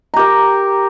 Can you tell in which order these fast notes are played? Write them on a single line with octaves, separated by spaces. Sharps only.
A#5 G4 A#4